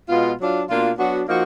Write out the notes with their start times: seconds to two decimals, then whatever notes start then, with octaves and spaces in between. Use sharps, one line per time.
0.09 B2 G#3 B3 F4
0.39 F#3 D4 F4
0.68 B2 A#3 D4 F4
0.97 F#3 B3 D4 F#4
1.27 F3 A#3 D#4 F#4